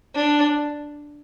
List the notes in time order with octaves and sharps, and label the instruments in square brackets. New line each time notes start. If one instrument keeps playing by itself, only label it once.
[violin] D4